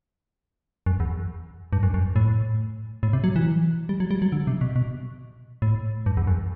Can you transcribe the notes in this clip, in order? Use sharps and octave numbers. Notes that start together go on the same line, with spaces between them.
F#2
E2
G2
F#2
F#2
A2
A2
C3
F#3
E3
G3
F#3
G3
F#3
D3
C3
B2
B2
A2
G2
E2
F#2